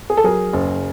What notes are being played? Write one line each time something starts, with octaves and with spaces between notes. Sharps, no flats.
G#4
A4
F#3 G#4 A#4
F#1